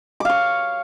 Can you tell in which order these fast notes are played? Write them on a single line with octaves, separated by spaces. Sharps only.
D6 F5 C#5